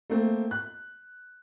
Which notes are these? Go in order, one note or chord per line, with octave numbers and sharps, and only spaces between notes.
A3 A#3 C4
F#6